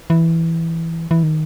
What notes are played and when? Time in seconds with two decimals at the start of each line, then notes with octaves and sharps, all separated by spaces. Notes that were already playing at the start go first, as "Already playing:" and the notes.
0.10 E3
1.11 E3
1.23 D#3